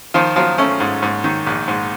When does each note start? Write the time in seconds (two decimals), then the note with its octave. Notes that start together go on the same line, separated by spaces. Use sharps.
0.14 D#3 F3 F4
0.36 F3 F#3 F4
0.58 A3 C#4
0.80 G#2
1.03 G#2
1.24 D#3
1.46 A#1
1.68 G#2